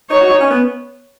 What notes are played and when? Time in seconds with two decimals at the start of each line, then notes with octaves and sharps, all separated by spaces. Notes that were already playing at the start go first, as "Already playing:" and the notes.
0.10 D#4 C#5
0.20 F#4
0.30 D#4
0.40 C#4
0.50 B3